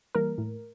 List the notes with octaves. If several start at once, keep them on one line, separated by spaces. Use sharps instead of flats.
E3 G3 A#3 A#4
A2